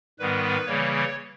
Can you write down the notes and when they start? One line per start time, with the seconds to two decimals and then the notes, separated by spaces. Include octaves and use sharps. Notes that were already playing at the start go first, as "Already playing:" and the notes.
0.19 G#2 D#3 G3 B3 B4
0.66 C#3 E3 G3 A#3 C#5